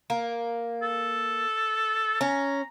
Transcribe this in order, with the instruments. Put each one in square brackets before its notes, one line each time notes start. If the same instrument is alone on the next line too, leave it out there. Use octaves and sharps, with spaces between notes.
[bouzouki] A#3
[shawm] A4
[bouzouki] C#4 [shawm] A#5